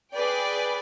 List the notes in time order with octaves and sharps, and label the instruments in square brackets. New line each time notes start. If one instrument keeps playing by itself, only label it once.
[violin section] G#4 B4 D5 G5